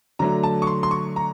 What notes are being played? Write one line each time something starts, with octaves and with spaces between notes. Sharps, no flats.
D3 F#3 A3 A#5
A5
C#6
C6
C6
C#6
A#5